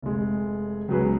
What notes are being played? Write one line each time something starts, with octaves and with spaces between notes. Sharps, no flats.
F1 G#3
C#2 B2 F#3 G#4 B4